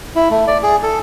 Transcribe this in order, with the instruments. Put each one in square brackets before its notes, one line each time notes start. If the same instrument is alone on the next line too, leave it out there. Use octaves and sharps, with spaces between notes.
[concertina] E4
A3
D5
G#4
A4